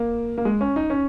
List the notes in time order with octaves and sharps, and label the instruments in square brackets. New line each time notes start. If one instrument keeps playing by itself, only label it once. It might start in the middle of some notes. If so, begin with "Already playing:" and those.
Already playing: [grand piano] A#3
A#3
G#3
C#4
D#4
C#4